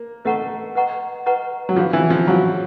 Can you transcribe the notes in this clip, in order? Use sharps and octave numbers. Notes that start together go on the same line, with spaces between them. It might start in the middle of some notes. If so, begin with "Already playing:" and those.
Already playing: A#3
A3 B4 D#5 F#5 A#5 C#6
B4 D#5 F#5 A#5 C#6
B4 D#5 F#5 A#5 C#6
F#3
F3 F4 G#4 C5 F5
E3
F3
F#3 F4 G#4 C5 F5